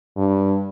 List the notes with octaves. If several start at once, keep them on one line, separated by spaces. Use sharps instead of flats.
G2